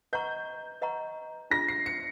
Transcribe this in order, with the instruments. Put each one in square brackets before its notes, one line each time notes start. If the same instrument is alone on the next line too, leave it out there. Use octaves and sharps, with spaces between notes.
[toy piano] B4 D#5 F#5 A#5 C#6 [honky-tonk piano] G6
[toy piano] B4 D#5 F#5 A#5 C#6
[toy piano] D4 F4 G#4 [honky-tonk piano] A#6
[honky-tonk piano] C7
C#7